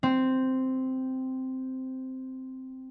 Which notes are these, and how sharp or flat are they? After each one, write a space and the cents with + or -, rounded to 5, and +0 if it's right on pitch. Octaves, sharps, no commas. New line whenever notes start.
C4 -5